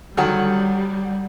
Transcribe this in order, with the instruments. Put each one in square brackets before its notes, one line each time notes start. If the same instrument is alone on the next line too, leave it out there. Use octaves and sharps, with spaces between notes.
[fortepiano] D3 D#3 F#3 [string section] G3 [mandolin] F#5 G#5